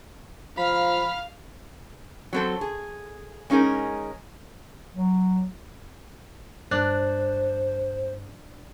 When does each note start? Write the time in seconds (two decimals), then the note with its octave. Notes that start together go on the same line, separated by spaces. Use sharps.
0.58 F3 F5 B5 F6
2.33 F#3 C4 A4
2.61 G#4
3.50 G#3 C#4 D#4 G#4 A#4
4.95 F#3
6.71 G2 D4 C5 F#6